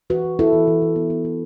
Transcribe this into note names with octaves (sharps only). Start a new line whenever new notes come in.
E3 F#4 B4
E3
B3 E4 A4
E3
E3
E3
B3
B3
B3